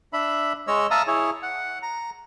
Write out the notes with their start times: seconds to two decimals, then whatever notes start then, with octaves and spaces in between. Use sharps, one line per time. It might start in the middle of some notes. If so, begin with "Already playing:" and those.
0.13 D4 E5 B5
0.67 G#3 C#5 D#5 E6
0.91 E5 F5 A5 A#5 D#6 E6
1.07 E4 G#4 C#5
1.43 F#5
1.82 A#5